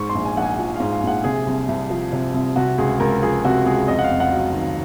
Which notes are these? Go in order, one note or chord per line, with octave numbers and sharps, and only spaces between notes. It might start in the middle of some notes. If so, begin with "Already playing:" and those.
Already playing: G#2 C#6
C6
A#1
G#5
A#1 F#5
G#5
F3
G#2 F5
F5
A#1 F#5
C3 G#4
C2
C2
F3
C3
C2
C3 F#4
C#2 G#4
C#2 A#4
F3 G#4
C3 F#4
C#2 G#4
F2 D#5
F#5
F5
F1
F#5
F#3
D#3